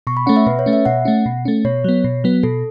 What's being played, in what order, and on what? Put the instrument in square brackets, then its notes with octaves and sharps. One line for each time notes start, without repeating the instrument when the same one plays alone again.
[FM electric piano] B2 [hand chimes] C#6
[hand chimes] B5
[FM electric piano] A3 C#4 [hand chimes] F#5
[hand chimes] E5
[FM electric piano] B2 [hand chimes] B4
[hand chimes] C#5
[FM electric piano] A3 C#4
[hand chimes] E5
[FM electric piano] B2 [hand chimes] F#5
[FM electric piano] A3 C#4
B2
A3 C#4
[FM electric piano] B2 [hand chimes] C#5
[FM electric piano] F#3 B3
B2
F#3 B3
[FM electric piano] B2 [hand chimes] A4